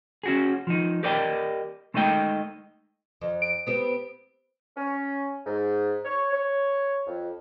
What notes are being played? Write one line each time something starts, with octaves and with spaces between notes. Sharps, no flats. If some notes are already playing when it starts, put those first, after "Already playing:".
C#4 F#4 G#4
F3 D#4
G4 A#4 D5 D#5 G5
G#3 A3 D#4 D#5 G5
F2
D7
B3 C4 G4
C#4
G#2
C#5
C#5
F2